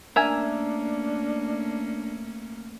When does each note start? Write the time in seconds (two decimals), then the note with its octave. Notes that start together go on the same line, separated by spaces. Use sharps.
0.16 A3 A#3 C#4 D4 A#4 E5 G#5